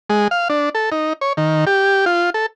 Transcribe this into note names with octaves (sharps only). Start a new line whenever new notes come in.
G#3
F5
D4
A4
D#4
C#5
D#3
G4
F4
A4